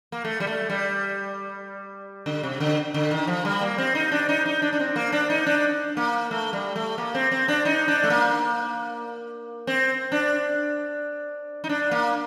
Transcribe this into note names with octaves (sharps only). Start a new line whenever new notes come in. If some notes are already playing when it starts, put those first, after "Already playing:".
A#3
A3
G3
A3
G3
D3
C3
D3
D3
D#3
F3
G3
A#3
C4
D#4
D4
D#4
D#4
D4
D4
C4
A#3
D4
D#4
D4
A#3
A3
G3
A3
A#3
C4
C4
D4
D#4
D4
A3
A#3
C4
D4
D#4
D4
A#3